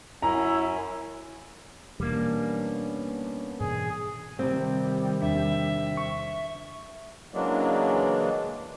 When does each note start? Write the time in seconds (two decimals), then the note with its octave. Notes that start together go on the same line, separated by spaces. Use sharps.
0.22 F#2 C#4 E4 A#5
2.00 E2 B2 E3 G3 A#3 B3 C#4 D4
3.60 G#2 B2 E3 G#4
4.39 C3 D#3 G3 C4
5.22 E2 D4 E5
5.97 C#6
7.34 C#3 E3 F#3 G#3 A#3 D4